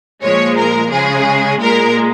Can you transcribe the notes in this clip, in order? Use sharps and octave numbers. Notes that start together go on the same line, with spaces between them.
A#2 F3 G#3 C#5
A#4
C#3 G#3 G#4
A#2 G#3 A#4